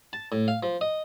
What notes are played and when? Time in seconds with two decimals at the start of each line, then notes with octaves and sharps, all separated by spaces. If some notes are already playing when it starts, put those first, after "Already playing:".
0.13 A5
0.32 A2
0.48 F5
0.63 F3
0.81 D#5